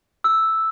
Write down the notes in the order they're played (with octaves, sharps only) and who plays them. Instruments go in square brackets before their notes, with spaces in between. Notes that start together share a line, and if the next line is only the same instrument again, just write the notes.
[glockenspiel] E6